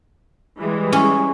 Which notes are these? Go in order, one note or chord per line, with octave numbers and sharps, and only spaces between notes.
E3 G3 G#3
C#4